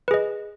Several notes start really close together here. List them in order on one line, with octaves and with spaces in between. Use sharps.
B4 G#4 D#5